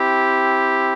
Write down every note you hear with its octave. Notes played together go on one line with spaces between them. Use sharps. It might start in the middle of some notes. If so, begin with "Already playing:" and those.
Already playing: C4 E4 G4